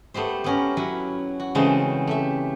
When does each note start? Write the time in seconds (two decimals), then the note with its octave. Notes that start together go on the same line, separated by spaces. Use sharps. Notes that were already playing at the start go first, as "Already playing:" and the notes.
0.14 A3 B3 G4 C5
0.44 B3 C#4 A#4
0.77 F#3 E4 B4
1.40 F#4
1.55 C#3 E3 G#3 A3 C4 C5
2.07 A3 G4 E5